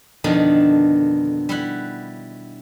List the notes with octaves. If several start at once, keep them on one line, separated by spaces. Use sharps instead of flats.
F2 B2 D3 D#3 D4
G3 E4 F#5